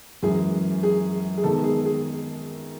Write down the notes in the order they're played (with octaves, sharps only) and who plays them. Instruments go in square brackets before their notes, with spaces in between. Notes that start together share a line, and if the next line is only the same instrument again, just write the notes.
[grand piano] F#2 E3 G#3 [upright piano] G#4
[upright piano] G#4
G#4
[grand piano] D#3 G#3 B3 [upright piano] A4
[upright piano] G#4
G#4